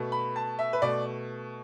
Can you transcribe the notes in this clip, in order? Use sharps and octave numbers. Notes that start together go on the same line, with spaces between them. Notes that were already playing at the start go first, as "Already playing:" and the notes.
Already playing: B2 A3
B5
A5
E5
B4
B2 A3 D5